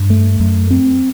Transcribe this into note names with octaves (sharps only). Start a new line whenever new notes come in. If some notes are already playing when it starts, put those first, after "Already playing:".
Already playing: G2
A3
F#2
C4